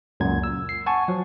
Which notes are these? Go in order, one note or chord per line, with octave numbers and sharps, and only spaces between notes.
C#2 F#2 A#2 G#6
E6
C7
F#5 G#5 A5 C#6
F3 F#3